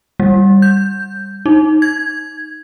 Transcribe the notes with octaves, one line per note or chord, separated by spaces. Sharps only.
G3
G6
D#4
G#6